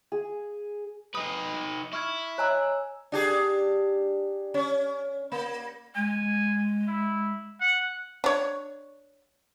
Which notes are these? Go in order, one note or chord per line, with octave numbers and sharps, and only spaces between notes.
G#4
D#4 B4 D#6
E4 C#6 F6 G#6
C#5 D#5 G#5 A#5 E6 F#6
D4 G4 G#4
C#4
A#3
G#3 G#5
E4
F#5
D4 C#5